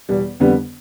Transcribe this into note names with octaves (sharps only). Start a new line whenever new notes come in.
E2 B2 G3
F2 D3 G3 B3